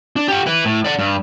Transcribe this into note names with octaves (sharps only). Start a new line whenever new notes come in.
D4
G4 F#5
E4 B4
A2
D5 F#5
G2